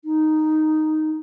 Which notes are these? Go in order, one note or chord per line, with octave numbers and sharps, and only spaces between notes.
D#4